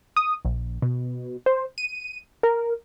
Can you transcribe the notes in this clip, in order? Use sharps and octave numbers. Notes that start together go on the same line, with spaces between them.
D#6
A#1
B2
C5
D#7
A#4